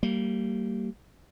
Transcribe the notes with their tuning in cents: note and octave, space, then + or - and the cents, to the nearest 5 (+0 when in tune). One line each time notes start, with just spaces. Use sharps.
G3 -20 A#3 -25